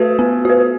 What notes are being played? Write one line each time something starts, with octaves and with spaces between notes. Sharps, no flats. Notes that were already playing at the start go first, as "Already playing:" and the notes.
Already playing: A3 F#4 B4
B3
F#4 B4